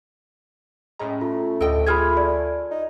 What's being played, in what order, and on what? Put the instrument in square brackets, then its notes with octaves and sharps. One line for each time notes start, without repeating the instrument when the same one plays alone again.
[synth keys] A2 C#4 A#5 [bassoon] G#3
[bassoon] A3 [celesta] F4
[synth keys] D2 D7 [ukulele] A4 D#5 G5
[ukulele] F4 G#4 E5 [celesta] B5 F6 G#6
[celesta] D5
[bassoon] D#4